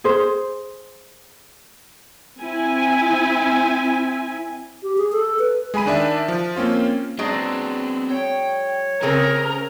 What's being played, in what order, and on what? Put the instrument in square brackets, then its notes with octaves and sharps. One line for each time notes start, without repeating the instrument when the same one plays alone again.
[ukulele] G#4 C5
[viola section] C4 E4 G#5
[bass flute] G4
G#4
A4
B4
[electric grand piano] G#3 G#4 G#5 B5 D#7
D#3 D4 D5 E5
F3
A#3 C4 C#4 F4
[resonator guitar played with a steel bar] F#3 G#3 D4 [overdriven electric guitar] B3 C4
[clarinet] C#5 [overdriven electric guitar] G5
[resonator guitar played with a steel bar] C#3 C4 G#4 [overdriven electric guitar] C#4 [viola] A#4